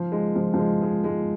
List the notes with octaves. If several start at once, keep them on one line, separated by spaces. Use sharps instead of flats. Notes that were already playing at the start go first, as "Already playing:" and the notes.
Already playing: F3
G#3
F3
F3
G#3
G#3
G#3